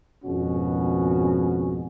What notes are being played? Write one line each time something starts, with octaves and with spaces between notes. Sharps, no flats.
G#1 F2 B2 C#4 F#4 G#4